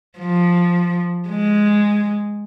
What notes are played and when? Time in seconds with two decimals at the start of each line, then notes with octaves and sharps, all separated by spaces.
0.19 F3
1.29 G#3